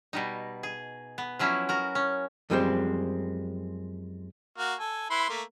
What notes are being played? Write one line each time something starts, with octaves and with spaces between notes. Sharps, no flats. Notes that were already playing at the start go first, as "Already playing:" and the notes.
B2 G3 D#4
G#4
B3
F3 F#3 C#4 E4
F#4 A#4
C#4
F#2 F3 G3 G#3 B3 C4
A#3 F#4 F5
A4 G#5
E4 B4 C6
A3 A#3